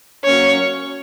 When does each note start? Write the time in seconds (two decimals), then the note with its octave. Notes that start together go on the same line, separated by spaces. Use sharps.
0.24 F#3 A#3 C#4 C#5